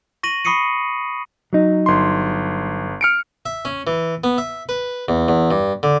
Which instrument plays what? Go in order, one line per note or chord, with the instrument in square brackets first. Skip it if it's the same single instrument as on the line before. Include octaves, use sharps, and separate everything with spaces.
[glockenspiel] C#6 A#6 D#7 F#7
B5 C#6 D#6 C7 C#7 D#7
[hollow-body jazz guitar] F#3 D#4
[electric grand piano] G1 C6
F6 C#7 D7
[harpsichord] E5
C#4
E3
B3
E5
B4
E2
E2
G2
D3